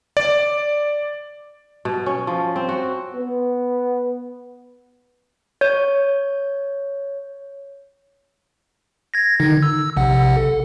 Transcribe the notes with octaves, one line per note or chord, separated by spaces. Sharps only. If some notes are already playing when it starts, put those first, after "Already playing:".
D5
B2
C#4
F3
C4
F#4
B3
C#5 G6
G#6 A#6
D3 D#3 D#4
E6
A#1 C3 F#5
A4